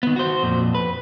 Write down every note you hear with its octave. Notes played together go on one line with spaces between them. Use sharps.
D#3 B3
F#4 C5
F2 A#2
B4